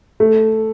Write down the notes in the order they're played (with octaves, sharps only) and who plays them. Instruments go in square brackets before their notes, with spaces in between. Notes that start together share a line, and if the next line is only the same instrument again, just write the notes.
[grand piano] A3